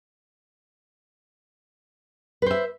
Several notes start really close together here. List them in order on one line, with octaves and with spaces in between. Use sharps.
B4 C5 E5